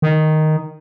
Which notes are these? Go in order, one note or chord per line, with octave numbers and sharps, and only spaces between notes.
D#3